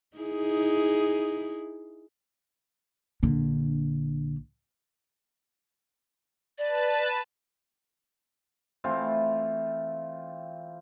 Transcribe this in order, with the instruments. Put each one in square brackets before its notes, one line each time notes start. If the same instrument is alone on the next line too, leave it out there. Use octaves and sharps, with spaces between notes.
[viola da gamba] D#4 E4 G#4
[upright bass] A#1 D3
[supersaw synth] B4 A5 [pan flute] D5
[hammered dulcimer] E3 A3 C4 F4